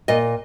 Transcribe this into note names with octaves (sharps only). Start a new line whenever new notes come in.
A#2 D#5